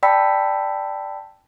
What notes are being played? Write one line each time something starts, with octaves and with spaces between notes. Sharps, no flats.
D5 G5 A5 B5 E6 B6